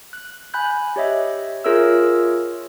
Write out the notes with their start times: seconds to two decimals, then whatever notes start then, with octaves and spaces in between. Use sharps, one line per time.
0.13 F#6
0.54 G#5 B5 F#6 G6
0.96 G4 C#5 D#5 E5
1.64 F4 G#4 A#4 C#5 E5 E6